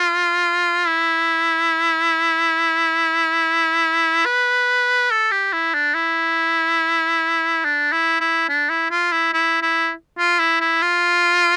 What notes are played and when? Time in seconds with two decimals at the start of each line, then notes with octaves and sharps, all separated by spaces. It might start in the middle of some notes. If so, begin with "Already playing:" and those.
Already playing: F4
0.87 E4
4.25 B4
5.11 A4
5.31 G4
5.53 E4
5.74 D4
5.95 E4
7.65 D4
7.92 E4
8.21 E4
8.49 D4
8.69 E4
8.90 F4
9.12 E4
9.33 E4
9.62 E4
10.19 F4
10.39 E4
10.60 E4
10.82 F4